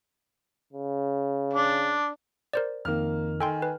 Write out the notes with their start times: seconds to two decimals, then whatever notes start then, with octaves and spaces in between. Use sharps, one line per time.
0.73 C#3
1.54 D4
2.53 A#4 C5 D5
2.85 F2 D#3 A#3 F6
3.41 D#3 A4 G5 G#5 C6
3.62 B4